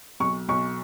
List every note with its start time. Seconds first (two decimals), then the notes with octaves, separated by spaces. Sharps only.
0.20 B1 C#6
0.49 B1 C#6